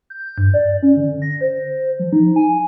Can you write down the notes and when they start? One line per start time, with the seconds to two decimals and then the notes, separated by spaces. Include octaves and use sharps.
0.10 G6
0.38 G2
0.54 D5
0.83 C#4
0.97 D3
1.22 A#6
1.41 C5
1.99 F3
2.13 D#4
2.36 G#5